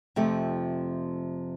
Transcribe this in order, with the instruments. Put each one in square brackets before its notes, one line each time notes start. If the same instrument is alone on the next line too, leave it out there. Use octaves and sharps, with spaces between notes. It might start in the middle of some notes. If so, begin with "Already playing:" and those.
[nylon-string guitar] F2 C3 F3 A3